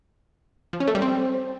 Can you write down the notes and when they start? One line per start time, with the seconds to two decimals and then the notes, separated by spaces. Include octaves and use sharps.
0.73 F3
0.80 C#4
0.88 A3
0.95 G3
1.02 C4